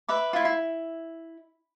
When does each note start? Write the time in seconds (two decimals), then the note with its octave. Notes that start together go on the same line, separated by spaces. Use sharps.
0.09 B4 E5 D6
0.33 E4 F4
0.45 E4